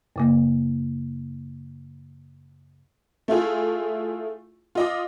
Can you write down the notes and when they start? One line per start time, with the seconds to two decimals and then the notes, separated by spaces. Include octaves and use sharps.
0.16 F#2 C#3 A#3
3.28 A3 E4 F4 G#4
4.75 F4 D#5 D6